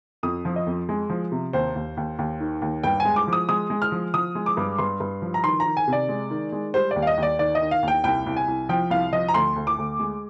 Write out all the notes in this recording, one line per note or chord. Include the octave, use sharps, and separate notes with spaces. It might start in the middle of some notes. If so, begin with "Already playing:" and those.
F2 D#6
F3
D#5
F2
G#3
F3
C3
D#2 C5
D#2
D#2
D#2
D#3
D#2
G2 G5
G#5
G#3
D6
F3
D#6
G#3 D#6
G#3
F6
F3
F3 D#6
G#3
D6
G2
G2 C6
G2
F3
A#5
D#3 C6
A#5
D#3
G#5
C3
D5
G#3
D#3
G#3
G3 C5
D#2 D5
F5
D#5
D#2
D5
D#3 D5
D#5
D#3
F5
D#2
G5
C2 G5
C2
G#5
C2
F3 G5
C2 F5
F3 D#5
A#5
D2 C6
D2
D6
D2
G#3